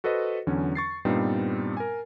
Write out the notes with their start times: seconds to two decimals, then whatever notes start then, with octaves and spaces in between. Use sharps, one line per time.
0.04 F#4 A4 B4 C5 D#5
0.47 E2 D3 F#3 C#4
0.75 C#6 A6 C7
1.05 G2 A#2 G3 B3 C4 D#4
1.77 A#4 G#5